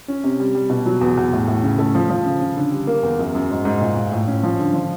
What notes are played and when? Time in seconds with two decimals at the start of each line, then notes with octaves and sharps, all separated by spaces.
0.08 C#4
0.24 C3
0.40 G3
0.55 G3
0.70 B2
0.86 F#3
1.01 E2
1.17 E2
1.33 A2
1.48 A2
1.63 C#3
1.79 A3
1.95 F3
2.10 F3
2.26 C#3
2.41 C#3
2.57 D3
2.72 G3
2.87 A#3
3.03 E2
3.19 F#2
3.35 F#2
3.50 G#2
3.65 G#2
3.81 A#2
3.96 A#2
4.12 A2
4.27 C#4
4.43 F3
4.59 D3
4.73 F3